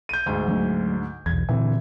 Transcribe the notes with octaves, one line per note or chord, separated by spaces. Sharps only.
G6 D#7
D2 G#2
F#3 A3 D4
B1 E2 G#6
A#2 D3 E3 C4